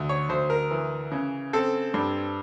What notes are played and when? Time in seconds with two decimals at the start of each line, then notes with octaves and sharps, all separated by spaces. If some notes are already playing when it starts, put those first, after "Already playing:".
Already playing: D2
0.09 C#5
0.29 D2 C5
0.50 A#4
0.71 E3
1.12 C#3
1.53 C4 A4
1.94 G2